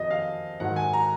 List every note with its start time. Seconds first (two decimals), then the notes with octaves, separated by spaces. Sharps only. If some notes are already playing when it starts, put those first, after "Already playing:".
Already playing: F2 D#3 F#3 D#5
0.11 F5
0.60 G#2 D#3 F#3 F#5
0.76 G#5
0.93 A#5